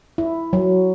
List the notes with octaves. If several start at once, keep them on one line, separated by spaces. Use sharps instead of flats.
E4
F#3